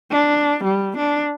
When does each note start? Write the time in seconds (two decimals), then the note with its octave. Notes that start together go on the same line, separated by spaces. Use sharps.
0.11 D4
0.64 G3
0.98 D4